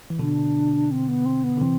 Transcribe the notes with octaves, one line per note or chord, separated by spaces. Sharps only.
E3
B2 D3 D4
C4
B3
C4
B3
D3
C3 E3 C4